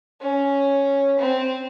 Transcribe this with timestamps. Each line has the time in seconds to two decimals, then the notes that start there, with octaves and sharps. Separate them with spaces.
0.21 C#4
1.19 C4